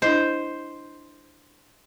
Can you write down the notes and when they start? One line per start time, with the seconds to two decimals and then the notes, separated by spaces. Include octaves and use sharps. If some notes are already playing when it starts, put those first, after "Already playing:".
0.02 D4 E4 C5 D#5